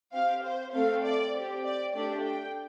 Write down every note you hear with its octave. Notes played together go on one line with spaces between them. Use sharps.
C4 G4 F5
C5
A3 C4 A4 F5
D5
C4 G4
D5
A3 D4 G4 D5
G5